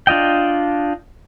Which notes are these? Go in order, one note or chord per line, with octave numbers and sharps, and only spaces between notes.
D4 F4 D#5 G5